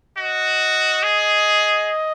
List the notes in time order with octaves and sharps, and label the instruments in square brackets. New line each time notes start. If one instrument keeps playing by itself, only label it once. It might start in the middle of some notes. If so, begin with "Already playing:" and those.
[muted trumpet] F#4 [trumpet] D#5
[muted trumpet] G#4